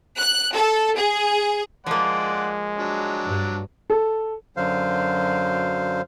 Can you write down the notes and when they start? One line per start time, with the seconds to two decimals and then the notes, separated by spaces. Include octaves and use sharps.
0.18 F#6
0.53 A4
0.97 G#4
1.87 F3 G#3 A#3 D5 F#5 C6
2.78 F#3 D4
3.24 G2
3.90 A4
4.57 F#2 D3 F#3 C5 F5